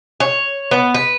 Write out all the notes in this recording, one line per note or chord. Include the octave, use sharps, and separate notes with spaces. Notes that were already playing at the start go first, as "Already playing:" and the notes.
C#5
B3
B4